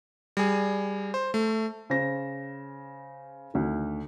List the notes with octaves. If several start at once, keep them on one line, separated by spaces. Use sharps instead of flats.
G3 G#4
C5
A3
C#3 C5 A#6
D2 D#3